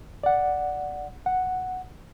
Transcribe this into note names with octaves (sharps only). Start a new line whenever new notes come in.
D5 F#5
F#5